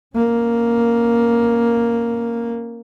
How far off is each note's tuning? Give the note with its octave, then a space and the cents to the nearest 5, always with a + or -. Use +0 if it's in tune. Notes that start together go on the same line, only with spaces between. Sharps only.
A#3 +0 C#4 -5